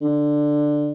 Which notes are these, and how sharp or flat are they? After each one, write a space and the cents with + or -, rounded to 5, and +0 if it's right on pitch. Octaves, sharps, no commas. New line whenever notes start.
D3 +10